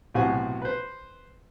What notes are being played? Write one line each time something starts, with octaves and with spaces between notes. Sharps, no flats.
B1 A2 C3 F#4 C5 G#5
B4 C5